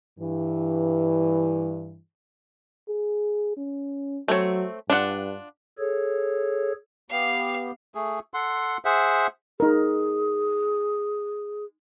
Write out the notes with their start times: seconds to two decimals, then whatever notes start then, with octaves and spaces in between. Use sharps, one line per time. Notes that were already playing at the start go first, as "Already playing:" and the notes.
0.19 G2 E3
2.89 G#4
3.57 C#4
4.28 F#3 A3 C4 C#5
4.90 G2 D4 F4 F#5
5.79 G#4 A4 C#5
7.11 B3 G4 F5
7.95 A3 G#4
8.34 A4 F#5 C6
8.85 G#4 C5 E5 F#5
9.60 D#4 G#4 A#4